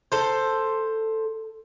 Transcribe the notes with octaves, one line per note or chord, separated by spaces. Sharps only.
A4 C5